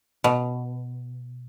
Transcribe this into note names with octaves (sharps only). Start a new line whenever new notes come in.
B2